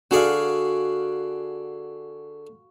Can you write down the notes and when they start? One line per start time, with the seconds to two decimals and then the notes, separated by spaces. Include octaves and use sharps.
0.11 D3 F#4 G#4 D5 F5